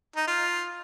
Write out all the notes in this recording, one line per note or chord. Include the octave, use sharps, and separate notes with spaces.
D#4
F4